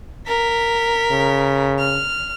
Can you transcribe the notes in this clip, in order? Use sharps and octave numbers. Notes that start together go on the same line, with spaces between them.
A#4 B6
C#3
F6